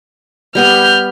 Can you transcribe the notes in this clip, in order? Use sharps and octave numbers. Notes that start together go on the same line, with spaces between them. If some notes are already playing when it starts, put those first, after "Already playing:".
G3 B3 B4 F6 G6